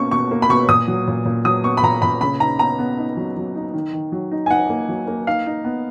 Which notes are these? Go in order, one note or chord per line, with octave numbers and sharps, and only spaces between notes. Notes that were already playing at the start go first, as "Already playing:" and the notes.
Already playing: B2 A#3 C#4 C#6
B2 C#6
A#3
B5
B2 C#6
A#2 D#6
F#3
A#2
A#2
F#3 D#6
B3 C#6
B5
A#2 A#5
A#2 B5
C#3 B5
D#4 A#5
B3 A#5
B3
D#4
F#3
F#3
D#4
D#3
D#3
F#3
D#4
G#5
D#4 F#5
A#3
F#3
A#3
D#4 F5
D#4
B3